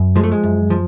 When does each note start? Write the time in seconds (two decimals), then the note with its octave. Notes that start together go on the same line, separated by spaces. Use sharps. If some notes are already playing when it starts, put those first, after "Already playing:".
Already playing: F#2
0.16 F3 G#3
0.24 A3
0.32 G#3
0.43 F#2
0.70 F3